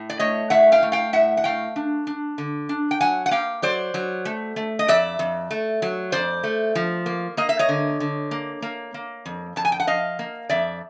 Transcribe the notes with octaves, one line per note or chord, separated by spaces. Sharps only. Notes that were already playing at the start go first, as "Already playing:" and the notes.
Already playing: A2
D5
A3 C#5 D#5
A2 E5 F#5
F5 G5
A3
F5 G5
A2 E5 F#5
F#5
A3 F5 G5
D4
D4
D3
D4
G5
F#3 F#5 G#5
F#5
A#3 F5 G5
F#3 C5 D5
F#3
A3
A3
D#5
F2 D5 E5
F2
A3
F#3
F2 C5 D5
A3
F3
A#3
A#3 D#5
E5
C#5 D#5
D3
D3
A#3
A#3
A#3
F2
F2 A5
G#5
G5
F#5
F3 D#5 F5
A#3
F2 D5 E5